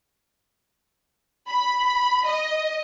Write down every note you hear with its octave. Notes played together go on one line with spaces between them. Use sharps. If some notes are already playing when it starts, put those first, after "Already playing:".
B5
D#5